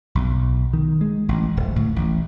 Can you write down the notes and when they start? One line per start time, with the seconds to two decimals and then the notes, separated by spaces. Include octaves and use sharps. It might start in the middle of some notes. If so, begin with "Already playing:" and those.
0.15 B1
0.73 D#3
1.01 G#3
1.29 A1
1.57 D1
1.76 A2
1.96 A1